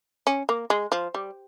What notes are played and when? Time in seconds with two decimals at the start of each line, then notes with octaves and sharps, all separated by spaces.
0.27 C#4
0.49 A#3
0.70 G#3
0.92 F3
1.14 G3